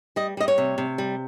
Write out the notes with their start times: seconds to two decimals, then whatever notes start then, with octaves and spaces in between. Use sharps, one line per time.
0.16 G3 D#5
0.37 G3 D#5
0.48 C#5
0.58 C3
0.78 C3
0.98 G3